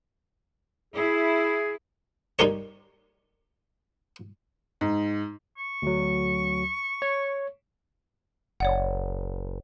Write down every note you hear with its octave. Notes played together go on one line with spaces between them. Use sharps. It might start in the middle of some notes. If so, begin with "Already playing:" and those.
E4 G#4
G3 D#4 G4 A#4 C#5
G#2
C#6
D2 F#3
C#5
F#1 C#5 D5 F#5